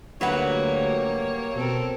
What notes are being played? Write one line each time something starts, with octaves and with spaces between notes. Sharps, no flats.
D2 F#3 G3 A#3 B4 C#5 F#5
B2 C4 A4 A#4